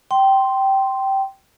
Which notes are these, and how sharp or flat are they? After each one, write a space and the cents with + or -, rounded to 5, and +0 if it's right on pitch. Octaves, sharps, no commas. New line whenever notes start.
G5 -15 C6 +0